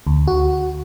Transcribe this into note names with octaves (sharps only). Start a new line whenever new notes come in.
D2
F#4